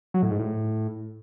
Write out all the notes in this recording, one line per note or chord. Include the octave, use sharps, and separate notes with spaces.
F#3
A2
G#2
A2